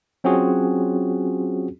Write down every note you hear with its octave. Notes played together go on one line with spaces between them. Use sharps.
F#3 C4 C#4 F4 F#4 G#4